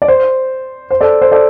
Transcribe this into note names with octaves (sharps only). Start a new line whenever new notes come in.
D5
C5
C5
A4 D5
C5
A4 D5